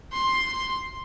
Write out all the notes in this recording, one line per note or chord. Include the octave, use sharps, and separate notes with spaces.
C6